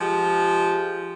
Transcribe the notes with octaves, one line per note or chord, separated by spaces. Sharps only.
F3 G#3 G4